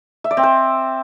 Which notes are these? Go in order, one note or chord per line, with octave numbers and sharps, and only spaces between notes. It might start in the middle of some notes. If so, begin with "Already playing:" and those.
E5
D5
C4
C5